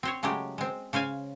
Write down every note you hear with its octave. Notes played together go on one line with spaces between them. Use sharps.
C4 C5 C#5
C#3 F#3 G#3 A3 G4
G#3 C4
C#3 C5 F5 G#5